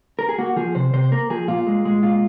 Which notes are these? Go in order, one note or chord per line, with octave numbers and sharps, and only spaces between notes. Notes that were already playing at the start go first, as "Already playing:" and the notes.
A#4
G#4
A#3 F#4
F3 G#4
C3 C5
C3 C5
A#3 A#4
F3 G#4
A#2 F4
G#3
G#3
A#2 F4